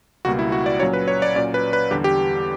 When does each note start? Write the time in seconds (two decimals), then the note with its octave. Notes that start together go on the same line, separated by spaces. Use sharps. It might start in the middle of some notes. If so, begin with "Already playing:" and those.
0.25 C#2 B2 G3 A#3 F#4
0.39 E4
0.52 F#4
0.66 D5
0.80 A#2 F#3 C#4 C#5
0.93 B4
1.08 C#5
1.22 D5
1.36 A#2 F#3 C#4 D5
1.54 B4
1.73 B4
1.91 E2 D3 G3 G4
2.04 G4